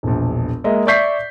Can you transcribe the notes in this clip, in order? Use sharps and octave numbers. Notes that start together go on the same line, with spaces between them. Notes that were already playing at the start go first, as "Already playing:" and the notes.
E1 A#1
G#3 A#3 D#5 E5
D5 E5 C#6 G6 B6 C7